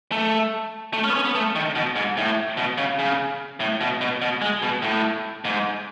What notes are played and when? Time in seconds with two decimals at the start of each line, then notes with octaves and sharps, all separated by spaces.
0.12 A3
0.94 A3
1.04 C#4
1.10 B3
1.14 C#4
1.25 B3
1.35 A3
1.56 D#3
1.75 B2
1.96 G#2
2.17 A2
2.57 B2
2.78 C#3
2.99 C#3
3.60 A2
3.81 B2
4.01 B2
4.22 B2
4.42 G#3
4.62 B2
4.82 A2
5.45 G#2